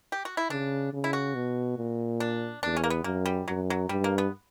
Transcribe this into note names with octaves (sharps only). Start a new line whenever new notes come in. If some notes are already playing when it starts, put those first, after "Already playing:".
G4
F#4
E4
C#3 D4
C#3
E4
F#4
B2
A#2
D4
E2 D4
C#4
A#3
B3
F#2 A#3
G3
F#2 F#3
F#3
G2 G3
A#3
B3